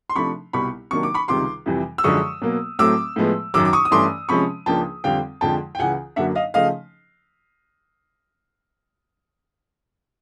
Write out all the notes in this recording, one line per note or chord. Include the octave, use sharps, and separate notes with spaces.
C6
C3 F3 A3 D4 B5 C#6
C2 B2 G3 B5 C#6
C3 D#3 F#3 A#3 D4 C#6
D6
B5 C#6
C#2 C3 D#3 G3 C6 D6
F2 C3 E3 G3
E6
F#2 D3 F3 G#3 C#6 D#6
B2 F#3 A#3
A2 F#3 A3 C4 D6 E6
A2 F3 G#3 B3
F#2 D#3 F#3 D6 E6
D6
C#6 D#6
D#6
G2 E3 A3 C#4 C6 D6
C3 F3 G#3 C#4 B5 C#6
C#2 C#3 F3 A#3 D4 G5 A5
F2 D3 G3 C4 F5 G5
F2 D3 F3 G#3 G5 A5
G5
C#2 C#3 E3 F#5 G#5
F#2 D3 F#3 A#3 D4 E5 F#5
D#5 F5
C#3 F3 A3 D#5 F5